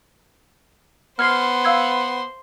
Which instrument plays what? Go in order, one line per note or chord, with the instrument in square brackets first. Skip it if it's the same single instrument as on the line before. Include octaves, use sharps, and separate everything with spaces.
[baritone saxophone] B3 [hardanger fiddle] C5 C6 [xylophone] F6 G#6 C7
[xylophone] F5 E6 G#6